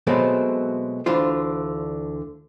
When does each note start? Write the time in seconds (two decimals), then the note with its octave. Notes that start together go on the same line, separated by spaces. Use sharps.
0.07 B2 F#3 G#3 A3 C4
1.06 D2 D3 E3 F4 C5